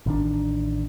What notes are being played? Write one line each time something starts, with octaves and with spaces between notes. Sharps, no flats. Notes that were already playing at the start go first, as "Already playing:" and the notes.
A1 D#3 D4